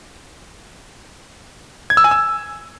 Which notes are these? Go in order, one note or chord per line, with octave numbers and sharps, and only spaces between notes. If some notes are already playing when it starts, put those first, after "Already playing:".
G#6
E6
G#5
E6